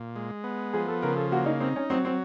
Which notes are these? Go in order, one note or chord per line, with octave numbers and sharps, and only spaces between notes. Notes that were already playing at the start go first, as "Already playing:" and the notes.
Already playing: A#2
G#3
B3
F3 G#4
A4
C#3 A#4
A4
A#3 F#4
D#4
C4 D#4
C#4
F#3 C4
C4